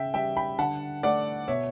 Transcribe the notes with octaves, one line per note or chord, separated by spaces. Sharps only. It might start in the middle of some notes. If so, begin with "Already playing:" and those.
Already playing: C#3 E5 G5
G3 E5 G5
G5 B5
D3 F#5 A5
A3 D5 F#5
B2 C#5 E5